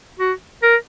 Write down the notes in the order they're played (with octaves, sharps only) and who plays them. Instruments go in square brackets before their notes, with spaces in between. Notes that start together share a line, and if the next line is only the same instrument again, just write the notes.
[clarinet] F#4
A#4